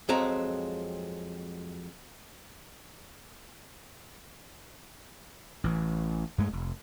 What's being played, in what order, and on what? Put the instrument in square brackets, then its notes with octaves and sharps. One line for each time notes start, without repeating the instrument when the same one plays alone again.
[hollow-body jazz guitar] F2 F#3 G#3 C4 A#5
[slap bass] A1 E3
G2 G#3 A3
F1